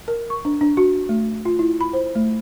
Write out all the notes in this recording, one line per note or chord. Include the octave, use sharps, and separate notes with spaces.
A#4
C#6
D4
D4
F#4
A3
F4
E4
B5
C5
A3